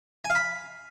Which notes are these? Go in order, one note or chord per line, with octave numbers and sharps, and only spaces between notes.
G#5
F5
B5